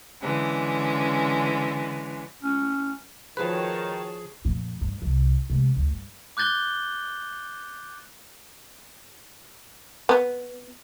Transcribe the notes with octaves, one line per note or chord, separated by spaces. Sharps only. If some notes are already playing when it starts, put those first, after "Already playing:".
D3 E3 G#3 C#4
C#4
D#3 F3 F#4 G#4 B4 C#5 A5
F2 A#2
G2
C2 C3
C3 G#3
D2
G2
D6 F#6 G6 A6 G7
B3